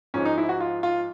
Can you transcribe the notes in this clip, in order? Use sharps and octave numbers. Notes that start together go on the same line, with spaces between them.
G#2 F3 G#3 C#4
D#4
E4
F#4
F4
F4